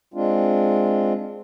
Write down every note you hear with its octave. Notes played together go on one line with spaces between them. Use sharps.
G#3 C4 D4 F4